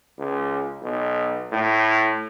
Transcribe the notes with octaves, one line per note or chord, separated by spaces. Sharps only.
C#2
B1
A2